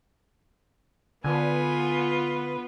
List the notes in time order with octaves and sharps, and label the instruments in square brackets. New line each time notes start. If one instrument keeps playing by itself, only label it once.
[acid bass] D3 [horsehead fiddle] B3 B4 [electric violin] F4 [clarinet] G#5